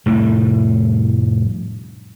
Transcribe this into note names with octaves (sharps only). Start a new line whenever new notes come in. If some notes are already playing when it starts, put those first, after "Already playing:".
F1 A2 G3